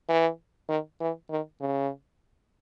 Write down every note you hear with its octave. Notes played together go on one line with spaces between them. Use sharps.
E3
D#3
E3
D#3
C#3